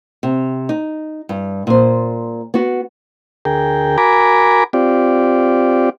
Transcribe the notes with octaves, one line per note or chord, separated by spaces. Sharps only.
C3
D#4
G2
A#2 C5
B3 F#4
D2 G#4 A#4 G5
F#4 A#4 G#5 A#5 B5 D6
C4 F4 G4 D5